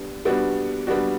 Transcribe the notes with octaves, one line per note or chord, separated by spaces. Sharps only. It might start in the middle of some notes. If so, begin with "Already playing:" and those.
Already playing: G3 B3 D4
G3 B3 D4 F#4
G3 B3 D4 F#4